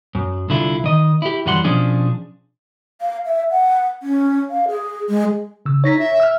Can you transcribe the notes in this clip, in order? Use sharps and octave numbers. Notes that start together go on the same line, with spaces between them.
F#2
C2 D3 E4 F4
D#3 D#5
E4 G4
F#2 E3 G3 F#5 C6
B2 F3 C#4 D4 G#4
F5
E5
F#5
C#4
F5
G#4
G#3
C#3 E6
D#4 C#5 A#6 B6
E5
E6 F6